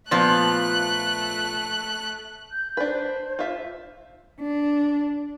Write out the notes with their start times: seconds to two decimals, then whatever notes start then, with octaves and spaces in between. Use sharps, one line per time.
0.11 A#2 F3 A3 B3 F#6
2.51 G6
2.77 D4 B4 C5
3.39 F4 E5
4.41 D4